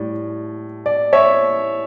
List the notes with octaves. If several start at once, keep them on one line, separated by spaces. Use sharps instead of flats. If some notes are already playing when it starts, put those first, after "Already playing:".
Already playing: A2 G3 D5
D5
C#5 E5